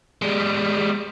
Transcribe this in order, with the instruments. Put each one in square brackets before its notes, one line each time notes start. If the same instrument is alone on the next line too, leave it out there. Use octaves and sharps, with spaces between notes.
[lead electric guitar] G3 G#3